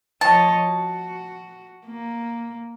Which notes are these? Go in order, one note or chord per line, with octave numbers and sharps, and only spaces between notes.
F3 C#5 D#5 A5
F#4
A#3